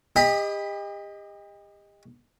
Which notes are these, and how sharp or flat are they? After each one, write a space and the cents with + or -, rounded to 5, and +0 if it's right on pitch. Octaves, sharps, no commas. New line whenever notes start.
G4 +40 D#5 +0 B5 +0